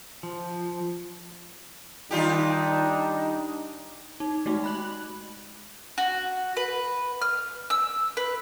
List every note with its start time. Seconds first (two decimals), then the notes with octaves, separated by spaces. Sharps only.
0.23 F3
2.11 D#3 G3 D4 D#4 F4 G4
4.20 D#4
4.46 G#3 A3 D#4 F#4
4.64 B5 F#6 F#7
5.98 F#4
6.57 B4
7.22 F6
7.70 E6
8.17 B4